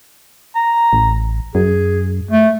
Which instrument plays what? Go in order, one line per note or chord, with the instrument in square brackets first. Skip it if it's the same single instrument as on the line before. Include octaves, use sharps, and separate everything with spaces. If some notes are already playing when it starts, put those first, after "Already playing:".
[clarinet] A#5
[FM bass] A1
[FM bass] F#2 [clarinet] G#4
[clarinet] A3